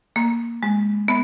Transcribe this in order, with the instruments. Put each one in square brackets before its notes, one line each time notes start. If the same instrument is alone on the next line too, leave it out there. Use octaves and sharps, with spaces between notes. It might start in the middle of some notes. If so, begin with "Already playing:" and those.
[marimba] A#3
G#3
B3